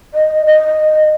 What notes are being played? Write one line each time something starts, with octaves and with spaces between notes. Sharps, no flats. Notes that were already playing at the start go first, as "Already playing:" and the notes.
D#5
D#5